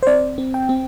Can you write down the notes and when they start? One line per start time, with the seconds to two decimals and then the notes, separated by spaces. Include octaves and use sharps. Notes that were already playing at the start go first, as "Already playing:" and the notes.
0.03 C5
0.07 C4 D5
0.38 C4
0.54 G5
0.69 C4